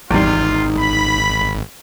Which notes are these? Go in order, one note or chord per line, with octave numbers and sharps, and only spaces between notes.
G#1 E2 G3 D#4 F4
B5